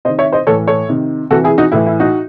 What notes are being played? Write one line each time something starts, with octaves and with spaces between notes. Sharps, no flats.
C3 D#3 C5 D#5
C#5 E5
C5 D#5
A2 E3 A4 C#5
A4 C#5
C3 D#3
C3 E3 F#4 A4
E4 G#4
D#4 F#4
A2 E3 E4
E4
D#4 F#4